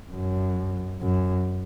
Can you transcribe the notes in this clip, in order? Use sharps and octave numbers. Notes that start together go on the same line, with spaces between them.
F#2
F#2